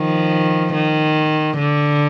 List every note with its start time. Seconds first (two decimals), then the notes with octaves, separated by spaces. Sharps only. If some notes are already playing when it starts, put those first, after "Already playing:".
Already playing: D#3 F3
0.74 D#3
1.59 D3